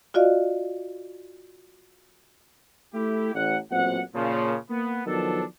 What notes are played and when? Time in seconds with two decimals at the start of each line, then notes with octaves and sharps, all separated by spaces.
0.14 F4 F#4 D5 D#5 F5
2.94 A3 E4 G4
3.35 A1 F#5
3.71 A1 A#2 F#3 C4 F#5
4.14 A#2 C#3 F3
4.70 A#3 B3
5.06 D#3 F3 F#3 B3 D4 A4